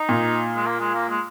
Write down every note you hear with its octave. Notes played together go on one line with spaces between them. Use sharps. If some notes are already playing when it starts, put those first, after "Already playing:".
Already playing: D#4
A#2
G#3
A#3
G#3
A#3
G#3